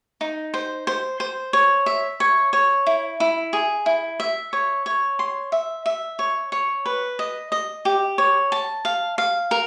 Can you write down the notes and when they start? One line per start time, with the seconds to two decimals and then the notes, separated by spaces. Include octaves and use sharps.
0.21 D#4
0.54 C5
0.87 C5
1.20 C5
1.53 C#5
1.86 E5
2.20 C#5
2.53 C#5
2.87 E4
3.20 E4
3.53 G#4
3.86 E4
4.20 E5
4.53 C#5
4.86 C#5
5.19 C6
5.52 E5
5.86 E5
6.19 C#5
6.52 C#5
6.86 B4
7.19 D#5
7.52 D#5
7.85 G4
8.18 C#5
8.52 A5
8.85 F5
9.18 F5
9.51 A#4